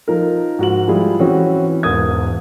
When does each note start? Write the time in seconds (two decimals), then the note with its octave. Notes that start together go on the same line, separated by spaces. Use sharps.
0.08 F3 D#4 A#4
0.59 G#2 F#4 F#7
0.88 F3 G3 G#3 E4 G#4
1.19 E3 C4 C#4 F#4
1.83 E1 G#2 A#4 D#6 G#6